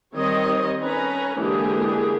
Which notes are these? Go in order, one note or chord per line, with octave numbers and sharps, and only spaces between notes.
D#3 G3 C4 C#5 D#5
C#4 A4 B4 G#5 A#5
D3 E3 G#3 A#3 G4 G#4